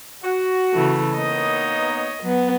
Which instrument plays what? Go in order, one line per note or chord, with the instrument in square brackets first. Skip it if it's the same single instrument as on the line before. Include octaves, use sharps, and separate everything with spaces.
[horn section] F#4
[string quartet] C#3 E3 A3
[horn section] A#3 B3 D#4 [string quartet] C#5 D#5
[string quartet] F#3 B3